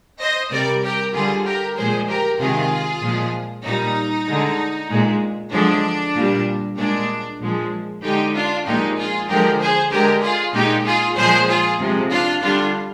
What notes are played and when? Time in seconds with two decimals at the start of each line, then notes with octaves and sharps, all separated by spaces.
0.19 C5 D#5
0.51 C3 G3 A#4 D5
0.82 G4 A#4
1.13 D3 G3 F4 G#4
1.45 G4 A#4
1.76 A#2 F3 G#3 G#4 C5
2.08 G4 A#4
2.39 C3 D#3 G#3 F4 G#4
3.02 A#2 F3 G#3
3.64 A#2 G3 D#4
4.27 D3 G#3
4.89 A#2 G#3
5.53 D3 F3 G#3 D4
6.15 A#2 G3
6.77 A#2 G#3 D4
7.40 A#2 F3 G#3
8.02 D3 G#3 D#4 G4
8.34 D4 F4
8.66 A#2 F3 G#3 D#4 G4
8.97 F4 G#4
9.28 D3 F3 G#3 G4 A#4
9.59 G#4 C5
9.91 D3 G#3 G4 A#4
10.22 F4 G#4
10.53 A#2 G#3 D#4 G4
10.85 F4 G#4
11.16 A#2 F3 G#3 G#4 C5
11.48 F4 G#4
11.79 C3 F3 G#3
12.10 D4 F4
12.41 D3 G3 D4 F4